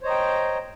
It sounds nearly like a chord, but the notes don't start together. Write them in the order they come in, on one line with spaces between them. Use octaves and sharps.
C5 C#5 D#5 A#5 G5